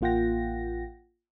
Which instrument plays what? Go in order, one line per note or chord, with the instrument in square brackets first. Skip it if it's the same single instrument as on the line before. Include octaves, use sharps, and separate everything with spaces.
[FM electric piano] A1 A#3 F4 F#5 G5 A#6